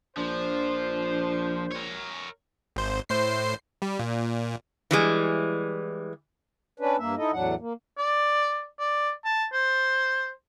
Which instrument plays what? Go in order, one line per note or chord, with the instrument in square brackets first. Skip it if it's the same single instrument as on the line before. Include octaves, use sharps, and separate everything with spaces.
[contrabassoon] A#1 [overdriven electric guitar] F3 [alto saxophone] D4 [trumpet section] C5
[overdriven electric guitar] A#4 C#5
[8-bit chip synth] G#1 C5
A2 C5 C7
G3
A#2
[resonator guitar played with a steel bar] E3 G3 G#3
[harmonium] C#4 D4 B4
G2 A#3 E5
D#4 E4 A4 D#5
E2 A2 F#3 D4 F#5
A#3
[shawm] D5
D5
A5
C5